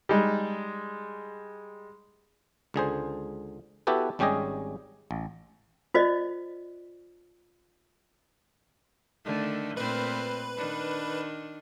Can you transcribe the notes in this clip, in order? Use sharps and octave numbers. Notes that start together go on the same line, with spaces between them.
G3 G#3 D#4
C#2 D3 G#4 C5
B3 E4 F#4 G4 A4 B4
G#1 G3 C#4 G4 G#4 D#5
A1
F4 C5 D5 D#5
D3 D#3 A3
A#2 A3 C4 B4
D#3 D4